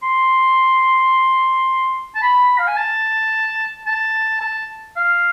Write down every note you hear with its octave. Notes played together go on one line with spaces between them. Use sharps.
C6
A5
B5
F5
G#5
A5
A5
A5
F5